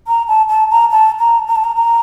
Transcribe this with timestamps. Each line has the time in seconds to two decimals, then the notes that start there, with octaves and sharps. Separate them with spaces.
0.08 A#5
0.28 A5
0.49 A5
0.70 A#5
0.91 A5
1.19 A#5
1.48 A#5
1.56 A5
1.64 A#5
1.76 A#5